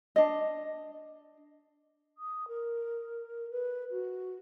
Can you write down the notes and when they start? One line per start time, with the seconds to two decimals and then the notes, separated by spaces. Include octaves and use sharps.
0.16 D4 D#5
2.18 D#6
2.48 A#4
3.51 B4
3.91 F#4